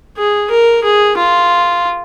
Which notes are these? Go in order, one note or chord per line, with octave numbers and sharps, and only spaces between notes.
G#4
A#4
G#4
F4